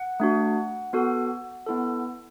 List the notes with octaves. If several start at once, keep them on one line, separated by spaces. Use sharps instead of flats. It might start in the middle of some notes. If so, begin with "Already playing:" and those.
Already playing: F#5
A3 D4 F#4
B3 F#4 A4
B3 E4 A4